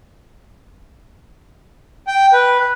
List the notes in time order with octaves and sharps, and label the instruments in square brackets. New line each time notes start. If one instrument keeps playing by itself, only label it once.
[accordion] G5
B4